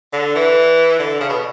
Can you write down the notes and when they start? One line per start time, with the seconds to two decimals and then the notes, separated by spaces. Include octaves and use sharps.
0.13 D3
0.35 E3
0.99 D3
1.21 C#3
1.29 B2